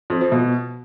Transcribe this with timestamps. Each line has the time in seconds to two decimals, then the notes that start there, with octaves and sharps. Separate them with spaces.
0.10 F2
0.21 F3
0.32 B2